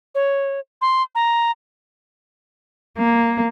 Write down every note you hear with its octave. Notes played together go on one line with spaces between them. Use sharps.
C#5
C6
A#5
A#3